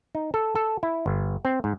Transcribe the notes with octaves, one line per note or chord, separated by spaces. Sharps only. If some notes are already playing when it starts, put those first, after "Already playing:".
D#4
A4
A4
E4
G1
C4
G#2